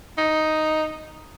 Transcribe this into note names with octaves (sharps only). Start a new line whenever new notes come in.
D#4